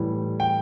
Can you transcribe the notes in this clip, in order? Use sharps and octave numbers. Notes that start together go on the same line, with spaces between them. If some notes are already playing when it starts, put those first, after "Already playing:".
Already playing: A2 E3 G3
G5